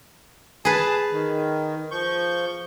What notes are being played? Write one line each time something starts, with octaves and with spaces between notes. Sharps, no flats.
G#4 B4 A5
D#3
F3 C#6 G6